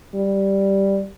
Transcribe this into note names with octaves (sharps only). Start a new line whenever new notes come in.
G3